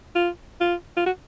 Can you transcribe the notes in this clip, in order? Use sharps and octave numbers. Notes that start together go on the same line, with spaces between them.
F4
F4
F4
F#4